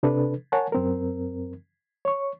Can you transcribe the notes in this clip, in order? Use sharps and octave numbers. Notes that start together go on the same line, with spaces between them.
C3 D4 A4 B4
A#4 C#5 F#5 G#5 A5
F#2 C4 A#4
C#5 C#6